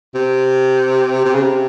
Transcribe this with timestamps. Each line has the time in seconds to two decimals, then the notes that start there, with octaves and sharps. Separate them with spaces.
0.15 C3
1.25 C3
1.34 C#3
1.42 C3